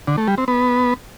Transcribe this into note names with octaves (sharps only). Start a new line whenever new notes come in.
D3
A3
G3
C4
B3